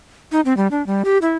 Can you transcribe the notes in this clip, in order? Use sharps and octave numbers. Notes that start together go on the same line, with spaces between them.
D#4
C4
G3
D4
G3
G4
E4